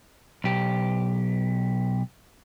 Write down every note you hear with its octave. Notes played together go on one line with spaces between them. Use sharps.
B1 G4